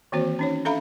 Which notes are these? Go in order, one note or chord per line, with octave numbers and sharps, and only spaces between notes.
D#3 E3 A#3 C4 F#4 C5
C#4 D#4 C#5
D4 A4 E5 F5 A#5 B5